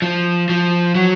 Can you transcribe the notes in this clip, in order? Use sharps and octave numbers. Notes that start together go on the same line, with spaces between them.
F3
F3
F#3